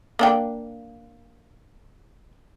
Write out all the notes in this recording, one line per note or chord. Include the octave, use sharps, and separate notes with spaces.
A#3 D4 G5